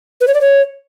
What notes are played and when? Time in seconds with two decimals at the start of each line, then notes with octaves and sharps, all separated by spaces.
0.21 B4
0.28 C#5
0.34 D5
0.41 C#5